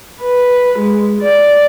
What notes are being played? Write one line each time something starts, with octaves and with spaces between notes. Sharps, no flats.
B4
G#3
D5